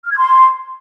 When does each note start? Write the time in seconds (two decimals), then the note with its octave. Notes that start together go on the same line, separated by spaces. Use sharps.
0.04 F6
0.11 G#6
0.18 C6